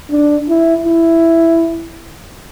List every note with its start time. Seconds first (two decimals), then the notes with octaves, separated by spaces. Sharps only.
0.11 D4
0.49 E4
0.85 E4